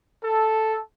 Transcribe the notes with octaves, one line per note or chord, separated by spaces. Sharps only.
A4